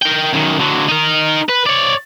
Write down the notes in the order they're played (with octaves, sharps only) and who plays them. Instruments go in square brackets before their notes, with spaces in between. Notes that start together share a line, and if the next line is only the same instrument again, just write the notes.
[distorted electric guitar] A#4 G5
F#2 D#3
D3 F#3
D#4 A#4
B4
C#5 D5